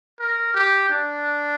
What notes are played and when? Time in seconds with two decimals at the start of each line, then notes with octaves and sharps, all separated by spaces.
0.20 A#4
0.54 G4
0.89 D4